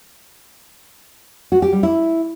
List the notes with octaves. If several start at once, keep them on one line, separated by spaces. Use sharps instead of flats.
F#4
G4
G3
E4